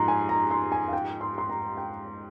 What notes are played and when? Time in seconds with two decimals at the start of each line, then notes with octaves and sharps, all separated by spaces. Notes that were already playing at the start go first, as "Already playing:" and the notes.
Already playing: G#2 F3 D#4 A#5 C6
0.08 G#5
0.29 A#5
0.51 C6
0.72 G#5
0.88 F5
0.93 G5
1.21 C6
1.38 C6
1.50 A#5
1.77 G5